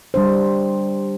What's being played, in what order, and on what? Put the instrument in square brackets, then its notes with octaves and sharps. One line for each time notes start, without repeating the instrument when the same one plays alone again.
[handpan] G3 D4 C5